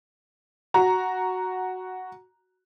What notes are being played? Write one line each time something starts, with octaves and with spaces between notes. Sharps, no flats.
F#4 A#5